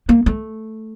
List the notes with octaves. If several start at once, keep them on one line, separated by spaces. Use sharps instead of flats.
A#3
A3